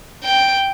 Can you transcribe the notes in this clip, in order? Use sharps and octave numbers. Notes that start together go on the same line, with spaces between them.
G5